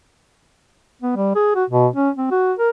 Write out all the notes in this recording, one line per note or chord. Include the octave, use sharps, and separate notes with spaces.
B3
G3
G#4
F#4
B2
C#4
C4
F#4
A#4